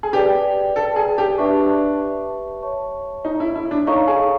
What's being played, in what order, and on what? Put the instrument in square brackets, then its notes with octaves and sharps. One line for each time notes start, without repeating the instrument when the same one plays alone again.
[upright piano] G#4
[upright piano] G4 [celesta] B4 D5 G5
[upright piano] A4
G#4
G4
[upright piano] D4 [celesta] G4 B4 E5 A5 C#6
[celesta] C#5 E5 A5 C#6
[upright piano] D#4
E4
E4
D4
[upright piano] D#4 [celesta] A4 C#5 F5 A#5 C#6
[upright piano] G#4